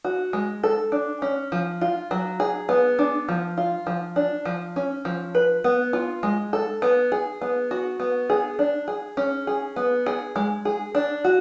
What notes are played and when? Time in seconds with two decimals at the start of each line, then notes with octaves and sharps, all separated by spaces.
0.04 F#4
0.33 G#3
0.63 A4
0.92 D4
1.22 C#4
1.52 F3
1.81 F4
2.11 F#3
2.40 G#4
2.69 B3
2.99 D4
3.28 F3
3.57 F4
3.87 F3
4.16 D4
4.45 F3
4.76 C#4
5.05 F3
5.35 B4
5.64 B3
5.93 F4
6.23 G#3
6.53 A4
6.82 B3
7.12 G#4
7.41 B3
7.71 F#4
8.00 B3
8.30 G#4
8.59 D4
8.88 G#4
9.17 C#4
9.47 G#4
9.76 B3
10.06 G#4
10.36 G#3
10.65 G#4
10.95 D4
11.24 F#4